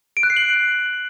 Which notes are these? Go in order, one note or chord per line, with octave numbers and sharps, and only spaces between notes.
D7
F#6
C7
F#7